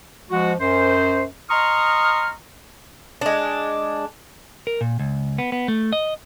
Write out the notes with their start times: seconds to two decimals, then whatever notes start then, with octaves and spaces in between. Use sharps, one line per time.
0.30 F3 G#3 F#4
0.59 F#2 C5
1.50 D#5 A#5 C6 C#6 D#6 F6
3.21 G#3 D4
4.67 A#4
4.81 A#2
4.99 C#2
5.38 B3
5.52 B3
5.68 A3
5.93 D#5